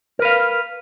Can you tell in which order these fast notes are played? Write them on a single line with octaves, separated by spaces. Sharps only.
A#4 B4 F5